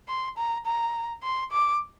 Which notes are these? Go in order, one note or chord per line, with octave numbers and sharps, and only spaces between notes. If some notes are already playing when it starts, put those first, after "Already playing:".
C6
A#5
A#5
C6
D6